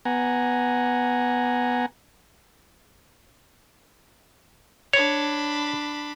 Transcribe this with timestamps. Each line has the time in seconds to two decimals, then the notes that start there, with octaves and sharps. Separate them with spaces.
0.05 B3 F#5 G#5 A#5
4.93 D4 C#5 B5